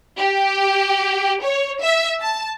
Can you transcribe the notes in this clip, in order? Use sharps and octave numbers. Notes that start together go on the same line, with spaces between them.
G4
C#5
E5
A5